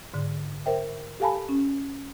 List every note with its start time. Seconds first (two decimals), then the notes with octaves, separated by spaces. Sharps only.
0.14 G#2 D3
0.66 A#4 C5 E5 G5
1.20 G4 A4 F5 G#5 A5 B5
1.49 C#4